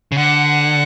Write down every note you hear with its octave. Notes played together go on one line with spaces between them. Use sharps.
C#3
D3 F#5